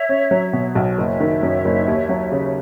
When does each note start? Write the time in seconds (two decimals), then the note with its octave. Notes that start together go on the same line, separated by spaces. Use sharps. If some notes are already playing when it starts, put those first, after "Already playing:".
Already playing: C#5 E5
0.09 C#4
0.31 F#3
0.53 B2
0.75 B1
0.98 F#1 C#5 E5
1.20 D#3
1.43 F#2
1.65 F#1
1.88 D#2
2.09 F#3
2.32 C#3